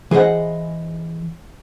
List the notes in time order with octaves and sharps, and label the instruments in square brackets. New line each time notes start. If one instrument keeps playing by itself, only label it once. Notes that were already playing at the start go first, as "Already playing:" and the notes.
[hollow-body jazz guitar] E3 G#4 C5 D#5 F#5